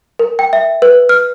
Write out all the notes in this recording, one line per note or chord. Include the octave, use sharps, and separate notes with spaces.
A#4
G5
E5
B4
F6